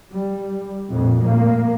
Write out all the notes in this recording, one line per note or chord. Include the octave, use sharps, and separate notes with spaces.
G3
A#1 F2 A2
A2 A#3